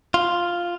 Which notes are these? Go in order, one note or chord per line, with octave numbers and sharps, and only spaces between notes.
F4